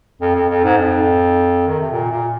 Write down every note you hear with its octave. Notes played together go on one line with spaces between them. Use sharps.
F2
F2
F2
G#2
F2
D#3
C3
A#2
A#2